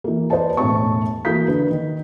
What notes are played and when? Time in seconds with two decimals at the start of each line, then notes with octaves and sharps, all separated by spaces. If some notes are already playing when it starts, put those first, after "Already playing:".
0.04 E3 A#3
0.30 B4 C5 D5 D#5 A5
0.57 E1 A2 E4 C#5 A5 C#6
1.25 E3 A#3 F#4 G6 B6
1.48 D3 B4
1.70 D#3